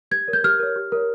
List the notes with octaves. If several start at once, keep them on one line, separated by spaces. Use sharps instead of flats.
G4 G#6
A#4 C#5
G6
G4 F6
A#4 C#5
G4
A#4 C#5